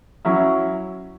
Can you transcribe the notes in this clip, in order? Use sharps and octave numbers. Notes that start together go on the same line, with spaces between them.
F#3 C#4 E4